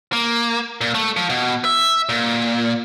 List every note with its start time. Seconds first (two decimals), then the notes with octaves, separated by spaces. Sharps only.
0.13 A#3
0.81 A#2
0.94 A3
1.17 F3
1.30 B2
1.65 E5
2.09 A#2